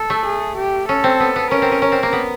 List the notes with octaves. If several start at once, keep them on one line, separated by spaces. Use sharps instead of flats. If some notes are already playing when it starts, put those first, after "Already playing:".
Already playing: A4
A3
G#4
G4
C#4 A4
C4
B3
B3
C#4 A#4
C4
C#4
C#4
C4
A#3
B3